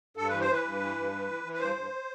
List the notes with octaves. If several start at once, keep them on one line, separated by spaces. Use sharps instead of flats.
G2 A4
E3 B4
C5
E3 B4
G2
E3
G2
E3
E3
E3
B4
G2 C5
G2